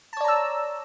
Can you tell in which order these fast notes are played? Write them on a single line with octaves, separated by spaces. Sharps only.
A5 C#5 D5 A#5 E6